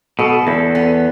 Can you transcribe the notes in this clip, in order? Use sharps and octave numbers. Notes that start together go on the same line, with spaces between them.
B2 A4
E2 A4
B3